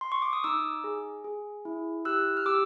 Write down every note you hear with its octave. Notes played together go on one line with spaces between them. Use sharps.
C6
C#6
D6
D#6
D#4 D6 E6
G#4
G#4
E4
G4 E6 F#6
F6
G4 D6 E6